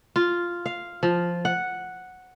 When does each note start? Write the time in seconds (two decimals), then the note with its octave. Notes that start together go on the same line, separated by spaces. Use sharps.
0.16 F4
0.66 F5
1.03 F3
1.45 F#5